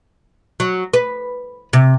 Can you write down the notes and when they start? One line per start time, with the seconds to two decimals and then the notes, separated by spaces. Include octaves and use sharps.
0.60 F#3
0.94 B4
1.73 C3